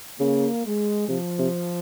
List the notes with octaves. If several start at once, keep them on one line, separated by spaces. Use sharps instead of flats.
C#3 A#3
G#3
C3 F3
C3